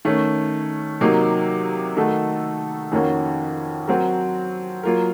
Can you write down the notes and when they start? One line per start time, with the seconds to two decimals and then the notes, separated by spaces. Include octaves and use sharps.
0.05 D#3 A3 C#4
1.01 C3 F#3 A#3 D#4
1.97 D#3 A3 D#4 F#4 A4
2.92 F2 D#3 A#3 C#4 F#4
3.87 F#3 C4 F#4 A#4
4.83 F#3 A#3 F4 A#4